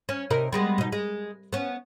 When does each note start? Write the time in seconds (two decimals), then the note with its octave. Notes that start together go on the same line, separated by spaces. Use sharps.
0.09 C#4
0.30 C3 D#4 A#4
0.53 G3 G#3 B3
0.78 B2 D#4
0.92 G#3
1.53 B3 C#4